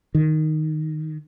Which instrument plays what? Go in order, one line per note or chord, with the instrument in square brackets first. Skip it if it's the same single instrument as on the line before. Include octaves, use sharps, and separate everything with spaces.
[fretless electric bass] D#3